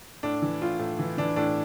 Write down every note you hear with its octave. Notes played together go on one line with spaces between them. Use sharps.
A2 D4
E3
A2 F4
A2
E3
E3 D4
A2 D4